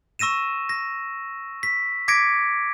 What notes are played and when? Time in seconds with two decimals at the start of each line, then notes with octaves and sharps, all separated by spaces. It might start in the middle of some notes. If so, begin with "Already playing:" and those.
0.19 C#6 E6 A#6 D#7 E7
0.69 A#6
1.63 B6
2.08 D6 G#6 A#6 B6 C#7 D7